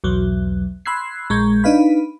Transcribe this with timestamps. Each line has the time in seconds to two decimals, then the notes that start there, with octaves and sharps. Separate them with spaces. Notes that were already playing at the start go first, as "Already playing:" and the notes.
0.04 B1 E2 F#3
0.86 B5 C6 E6 F#6 G#6 C7
1.30 A#1 G#3 A#5 C#6 G6 G#6
1.64 D4 D#4 B4 F5 B5